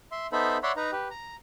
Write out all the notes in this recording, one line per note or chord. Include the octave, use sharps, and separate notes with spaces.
E5 C6
B3 D#4 A4 C5 E5 B5
C#5 D5 E5 F#5 B5 C6
D#4 B4 A#5
G4 B4
A#5